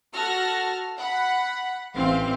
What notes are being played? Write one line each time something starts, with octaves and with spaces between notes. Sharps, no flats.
F#4 A4 F#5 A5 F6 A#6
F#5 B5
A1 E3 C4 F5